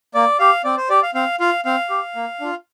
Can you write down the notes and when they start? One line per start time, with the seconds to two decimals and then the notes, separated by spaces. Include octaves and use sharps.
0.15 A#3 D5
0.39 G4 F5
0.64 C4 D5
0.77 C5
0.89 G4 D5
1.03 F5
1.15 C4 F5
1.40 F4 F5
1.65 C4 F5
1.90 G4
2.15 A#3
2.40 D4 F4